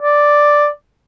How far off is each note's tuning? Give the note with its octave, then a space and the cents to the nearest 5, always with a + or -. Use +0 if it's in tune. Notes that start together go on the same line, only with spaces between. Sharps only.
D5 +0